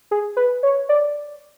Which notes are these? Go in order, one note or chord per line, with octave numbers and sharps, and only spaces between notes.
G#4
B4
C#5
D5